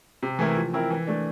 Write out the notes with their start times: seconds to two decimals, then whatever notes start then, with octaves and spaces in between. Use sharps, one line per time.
0.23 C3
0.39 E3 A3 E4 A#4
0.57 F3
0.73 C4 E4 A#4
0.90 E3
1.07 A3 D4